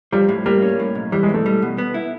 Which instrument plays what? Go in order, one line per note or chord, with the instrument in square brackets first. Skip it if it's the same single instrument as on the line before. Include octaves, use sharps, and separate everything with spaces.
[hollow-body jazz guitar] F3 [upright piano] G3
[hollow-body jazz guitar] A2
[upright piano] G3 [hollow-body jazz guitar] A#3
[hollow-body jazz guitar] C#4
A2
B1
[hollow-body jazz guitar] E3 [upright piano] G3
[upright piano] G#3
[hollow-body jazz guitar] B1 [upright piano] A3
[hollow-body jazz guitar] G3
B2
B3
E4